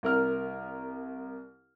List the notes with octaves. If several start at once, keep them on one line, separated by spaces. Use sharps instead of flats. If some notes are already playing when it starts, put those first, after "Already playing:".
C2 A#4 F6